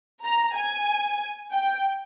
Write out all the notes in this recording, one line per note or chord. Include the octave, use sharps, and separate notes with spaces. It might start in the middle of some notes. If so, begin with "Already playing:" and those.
A#5
G#5
G5